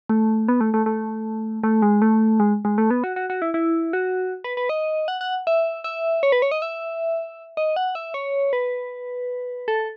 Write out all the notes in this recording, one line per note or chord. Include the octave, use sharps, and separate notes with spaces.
A3
B3
A3
A3
A3
A3
G#3
A3
G#3
G#3
A3
B3
F#4
F#4
F#4
E4
E4
F#4
B4
B4
D#5
F#5
F#5
E5
E5
C#5
B4
C#5
D#5
E5
D#5
F#5
E5
C#5
B4
A4